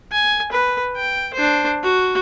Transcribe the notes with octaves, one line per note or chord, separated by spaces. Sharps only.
G#5
B4
G5
D4 C5
F#4